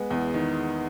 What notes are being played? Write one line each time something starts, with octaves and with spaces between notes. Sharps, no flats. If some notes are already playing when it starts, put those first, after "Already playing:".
Already playing: G#3 B3
E2
D#3